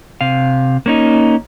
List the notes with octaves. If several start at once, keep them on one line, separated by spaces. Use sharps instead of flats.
C3 F5
A#3 C#4 D#4